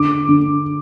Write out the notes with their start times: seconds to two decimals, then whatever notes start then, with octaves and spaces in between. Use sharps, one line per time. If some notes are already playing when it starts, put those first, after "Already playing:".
Already playing: D3 D6
0.28 D3